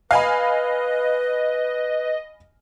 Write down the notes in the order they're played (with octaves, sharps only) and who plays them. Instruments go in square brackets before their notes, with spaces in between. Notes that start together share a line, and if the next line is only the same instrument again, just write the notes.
[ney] B4 [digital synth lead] D#5 [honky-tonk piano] F5 G#5 B5